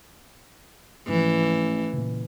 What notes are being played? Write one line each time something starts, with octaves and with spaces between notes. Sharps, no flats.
A1 G#2 E3 F3
A#2 C#3